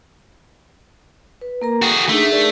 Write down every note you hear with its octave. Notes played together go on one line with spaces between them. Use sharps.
B4
A#3 A#4 A#5
F#4 G#4 A4
A3 D4 D#4 G#4
G#4 A#4 D5